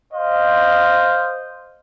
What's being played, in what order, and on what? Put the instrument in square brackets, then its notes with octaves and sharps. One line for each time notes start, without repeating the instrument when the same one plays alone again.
[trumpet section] C5 D#5 F5